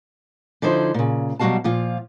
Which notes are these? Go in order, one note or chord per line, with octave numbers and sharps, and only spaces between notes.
D3 F3 D#4 E4 C5
A#2 C#3
B2 F#3 G3 F#4 F5 A5
A#2 F3 F4